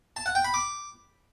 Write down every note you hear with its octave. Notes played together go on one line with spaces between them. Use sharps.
A5
F#5
G5
B5
D6